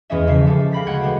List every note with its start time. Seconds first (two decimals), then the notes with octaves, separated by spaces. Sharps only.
0.10 E2 E3 G#3 C#4 D#5 E5
0.27 G#1 C#3 F3 E5 C7
0.47 G3 G#3 A4
0.72 F5 G5 B5 A#6 B6
0.86 D2 G#3 F#4 F#5 G5 G#6
1.03 E3 G3 G#3 C4